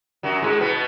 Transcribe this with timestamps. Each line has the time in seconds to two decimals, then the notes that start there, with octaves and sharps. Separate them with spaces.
0.23 F#2 F#3
0.42 G#2 G#3
0.60 B2 B3